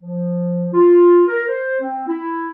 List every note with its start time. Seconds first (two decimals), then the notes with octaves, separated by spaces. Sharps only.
0.02 F3
0.73 F4
1.27 A#4
1.47 C5
1.80 C4
2.07 E4